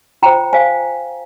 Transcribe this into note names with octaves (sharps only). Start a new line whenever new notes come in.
F4 C5 G5 A#5
C5 F5 G#5